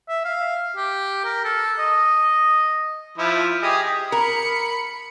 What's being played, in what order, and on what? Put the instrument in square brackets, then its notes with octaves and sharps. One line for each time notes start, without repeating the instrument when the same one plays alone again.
[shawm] E5
F5
G4
A#4
A4
D#5
[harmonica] F3 E4
G4 G#4 D#5
[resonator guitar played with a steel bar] A#4 [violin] B5 C#7